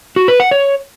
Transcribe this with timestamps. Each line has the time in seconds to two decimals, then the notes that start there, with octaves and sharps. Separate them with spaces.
0.16 F#4
0.28 B4
0.40 F#5
0.51 C#5